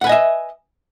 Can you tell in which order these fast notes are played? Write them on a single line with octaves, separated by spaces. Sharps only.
F#5 B4 G#5 D#5 E5